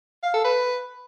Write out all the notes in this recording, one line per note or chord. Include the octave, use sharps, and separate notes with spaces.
F5
A4
B4